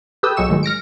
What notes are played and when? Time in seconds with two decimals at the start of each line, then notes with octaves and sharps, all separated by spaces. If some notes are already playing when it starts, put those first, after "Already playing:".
0.23 G4 A4 B4 D#6 E6 G6
0.37 B1 F#3 G#3 C#6 E6 E7
0.49 A2 D#3 F#3 G#3
0.63 F6 A#6 C#7 D7